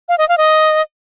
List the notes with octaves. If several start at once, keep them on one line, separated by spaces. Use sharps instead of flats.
F5
D#5
F5
D#5